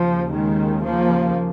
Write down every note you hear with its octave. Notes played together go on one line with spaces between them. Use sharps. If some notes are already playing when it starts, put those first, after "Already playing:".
Already playing: D#2 C#3 F3
D#3 G#3
F3 A#3